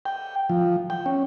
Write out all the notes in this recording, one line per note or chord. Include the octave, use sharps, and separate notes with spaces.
G5
F3
G5
C#4